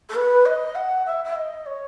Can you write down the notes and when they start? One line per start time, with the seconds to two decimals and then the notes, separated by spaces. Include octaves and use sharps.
0.09 A4
0.15 B4
0.45 D#5
0.75 F#5
1.06 E5
1.24 E5
1.35 D#5
1.66 C#5